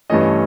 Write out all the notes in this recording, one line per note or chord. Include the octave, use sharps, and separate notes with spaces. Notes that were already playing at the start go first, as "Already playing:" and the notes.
G2 E3 A3 C#4 D#5
D#5